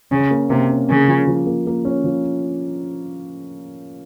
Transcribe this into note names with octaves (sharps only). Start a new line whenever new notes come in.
C#3 C#4
A#3
C3 A#3
C#4
C#3 A#3
F3
F3
A#3
A#3
C#4
F3